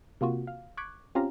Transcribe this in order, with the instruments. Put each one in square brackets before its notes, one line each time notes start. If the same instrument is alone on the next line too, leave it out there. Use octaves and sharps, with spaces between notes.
[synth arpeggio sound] C3 A#3 F4 F#4
F5
C#6 D6 F#6 G#6 B6
C4 C#4 F4 G4 F5 A#5